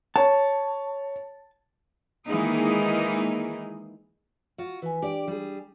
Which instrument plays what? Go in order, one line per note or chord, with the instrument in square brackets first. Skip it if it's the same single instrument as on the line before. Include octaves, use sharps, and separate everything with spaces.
[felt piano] C#5 [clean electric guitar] A5
[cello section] D#3 E3 G#3 A#3 D#4 G#4
[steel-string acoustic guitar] F4 F#4
[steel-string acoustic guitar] E3 [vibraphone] B4 G#5
[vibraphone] D4 [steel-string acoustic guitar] G4 D5
[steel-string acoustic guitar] G3 G#4